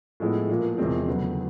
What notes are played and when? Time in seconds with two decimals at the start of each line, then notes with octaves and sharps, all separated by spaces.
0.20 A2 F3 G#3 B3 E4
0.49 A#2 F3 A#3
0.78 E2 C3 F3 G#3 C4
1.07 D2 C#3 F#3 B3